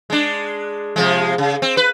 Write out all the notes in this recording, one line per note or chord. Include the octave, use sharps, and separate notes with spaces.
G#3 D4
C3 F3 G#3
C#3
C4
B4